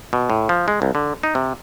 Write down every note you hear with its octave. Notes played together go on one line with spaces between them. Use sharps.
B2
A2
F3
G#3
C2
D3
D#4
C3